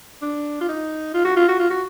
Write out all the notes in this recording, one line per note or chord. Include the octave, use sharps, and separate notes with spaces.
D4
F4
D#4
F4
F#4
F4
F#4
F4
F#4